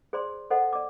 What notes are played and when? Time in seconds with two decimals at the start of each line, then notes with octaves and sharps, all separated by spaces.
0.13 G#4 C5 D5 C6
0.50 A4 C5 D#5 F#5
0.73 D5 D6